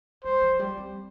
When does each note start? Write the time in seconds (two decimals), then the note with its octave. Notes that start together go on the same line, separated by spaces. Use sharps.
0.24 G3 C5
0.42 F3
0.59 G3
0.78 C4